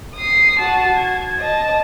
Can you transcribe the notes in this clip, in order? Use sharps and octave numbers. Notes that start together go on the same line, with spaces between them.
D#6 C7
F#4 A5
G#6
D#5 A5